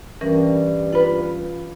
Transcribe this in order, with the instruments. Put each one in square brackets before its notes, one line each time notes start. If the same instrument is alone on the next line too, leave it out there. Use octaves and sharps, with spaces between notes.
[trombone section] G2 [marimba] E3 C#4 A#4
[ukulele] F4 B4